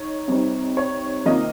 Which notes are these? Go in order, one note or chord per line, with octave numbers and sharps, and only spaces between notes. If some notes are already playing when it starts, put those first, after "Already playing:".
Already playing: D#4 C#5
C3 G3 C4 D#4
C#5
C3 D#3 A#3 F4 D#5